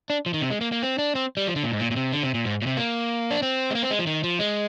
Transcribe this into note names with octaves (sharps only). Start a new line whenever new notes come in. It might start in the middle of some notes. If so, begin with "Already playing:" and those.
D4
F3
D#3
C3
G#3
A#3
A#3
C4
D4
C4
G3
F3
D3
A#2
G#2
A#2
A#2
C3
D3
C3
A#2
G#2
A#2
C3
A#3
D4
C4
G#3
A#3
C4
G#3
F3
D#3
F3
G#3